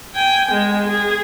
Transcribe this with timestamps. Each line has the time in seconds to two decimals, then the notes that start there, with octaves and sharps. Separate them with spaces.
0.15 G5 G#5
0.51 G#3
0.86 G#4